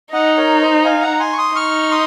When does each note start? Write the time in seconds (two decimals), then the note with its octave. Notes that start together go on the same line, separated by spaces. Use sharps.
0.13 D#4 D#5 F#5
0.37 A#4 C#5
0.61 C5 D#5
0.84 F5 G#5
1.02 F#5 A#5
1.20 G#5 C6
1.33 C#6
1.38 C6 D#6
1.55 D#4 C#6 F6
1.91 C6 D#6